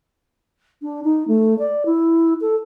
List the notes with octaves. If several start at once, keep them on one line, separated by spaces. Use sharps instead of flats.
D4
D#4
A3
D5
E4
A4